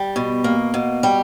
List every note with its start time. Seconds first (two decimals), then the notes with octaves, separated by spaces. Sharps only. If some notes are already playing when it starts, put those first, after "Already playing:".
Already playing: G3
0.16 B2
0.44 A#3
0.74 B2
1.03 G3